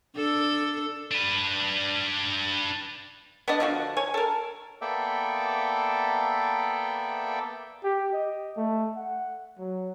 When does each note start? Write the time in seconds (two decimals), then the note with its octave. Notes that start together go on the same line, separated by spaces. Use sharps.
0.16 D4 A4
1.11 D4 B4
3.48 B3 D4 D5 D#5
3.60 D3 F3 F#4
3.97 C#5 G#5
4.14 A4 A#4
4.81 A#3 B3 A4 D5 E5 G5
7.84 G4
8.13 D#5
8.57 A3
8.96 F#5
9.58 F#3